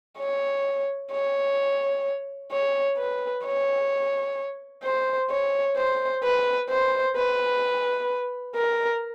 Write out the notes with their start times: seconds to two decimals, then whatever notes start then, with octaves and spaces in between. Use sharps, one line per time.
0.18 C#5
1.11 C#5
2.52 C#5
2.98 B4
3.44 C#5
4.84 C5
5.30 C#5
5.77 C5
6.23 B4
6.70 C5
7.16 B4
8.56 A#4